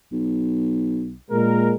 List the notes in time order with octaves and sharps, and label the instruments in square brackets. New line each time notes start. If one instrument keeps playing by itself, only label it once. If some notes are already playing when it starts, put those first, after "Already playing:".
[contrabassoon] B1
[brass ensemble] A#2 G#3 A#4